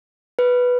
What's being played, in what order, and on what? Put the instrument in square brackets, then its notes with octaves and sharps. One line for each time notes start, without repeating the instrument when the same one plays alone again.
[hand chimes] B4